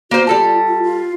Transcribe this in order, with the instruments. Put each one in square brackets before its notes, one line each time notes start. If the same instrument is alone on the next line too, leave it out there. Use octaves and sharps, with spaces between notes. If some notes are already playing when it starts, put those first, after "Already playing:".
[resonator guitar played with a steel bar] A#3 C5 [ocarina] F#4
[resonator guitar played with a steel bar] G3 A4 A5 [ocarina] F4
[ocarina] F4
F4